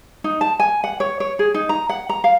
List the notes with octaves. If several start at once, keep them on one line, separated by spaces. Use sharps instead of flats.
D#4
A5
G#5
F#5
C#5
C#5
G#4
D#4
A#5
F#5
A#5
F5